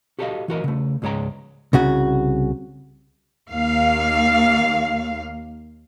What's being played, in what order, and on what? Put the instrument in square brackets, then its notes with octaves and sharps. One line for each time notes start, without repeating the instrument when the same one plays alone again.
[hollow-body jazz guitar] F#4 G4 A4 A#4 D#5 F5
E3 F#4 A#4 D#5
C#3 A3
C#2 G#2 G#3 C#5 G5 A#5
C2 C#3 F#4
[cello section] D#2 F5